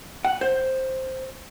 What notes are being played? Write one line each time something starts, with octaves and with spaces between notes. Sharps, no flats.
F#5
C5